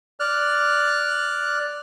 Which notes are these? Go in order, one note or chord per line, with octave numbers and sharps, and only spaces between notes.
D5 F6 F#6